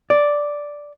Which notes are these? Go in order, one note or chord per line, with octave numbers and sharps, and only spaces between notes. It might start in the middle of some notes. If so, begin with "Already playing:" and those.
D5